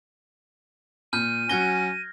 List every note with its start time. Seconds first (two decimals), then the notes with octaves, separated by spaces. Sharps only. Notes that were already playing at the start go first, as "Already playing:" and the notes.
1.13 A#2 F6 G6 D#7
1.49 F#3 C#4 F#4 G#5 G#6 A#6 G7